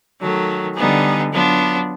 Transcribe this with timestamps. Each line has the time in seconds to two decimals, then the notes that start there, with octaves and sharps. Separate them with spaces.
0.20 D#3 F#3 A3
0.76 D3 G3 B3 D#4 G#4
1.31 F#3 B3 D4 F4